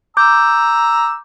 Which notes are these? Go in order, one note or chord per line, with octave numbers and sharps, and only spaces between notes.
A#5 D6 E6 G6